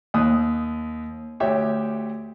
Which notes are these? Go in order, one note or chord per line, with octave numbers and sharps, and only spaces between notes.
D#2 D#6 F#6
D2 G4 C#5 E5 G5